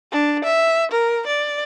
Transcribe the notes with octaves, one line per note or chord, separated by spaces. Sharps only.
D4
E5
A#4
D5